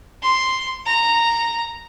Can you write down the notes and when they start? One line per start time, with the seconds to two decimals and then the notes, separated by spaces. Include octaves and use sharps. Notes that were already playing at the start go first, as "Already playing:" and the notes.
0.22 C6
0.86 A#5